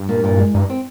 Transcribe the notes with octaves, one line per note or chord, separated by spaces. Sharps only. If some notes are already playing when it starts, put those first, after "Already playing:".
Already playing: G2
A#2
A#2
G#3
G2 D#4
C4